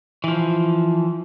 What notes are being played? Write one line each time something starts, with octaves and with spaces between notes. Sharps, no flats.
E3 F3